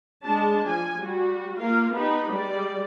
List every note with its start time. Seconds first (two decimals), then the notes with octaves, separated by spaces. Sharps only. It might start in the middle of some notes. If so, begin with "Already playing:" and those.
0.24 G#3 D4 A5
0.67 F3 G#5
1.00 G3 F#4
1.59 A#3 F4 A#4 F5
1.95 B3 D#4 G4 B5
2.33 G3 G#3 D5